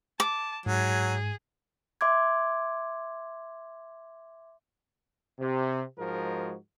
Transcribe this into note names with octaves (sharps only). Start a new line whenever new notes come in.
A5 D6
G#2 F#3 G#4
E5 C6 D6 G#6
C3
G#2 F3 G#3 F#4 G#4 A#4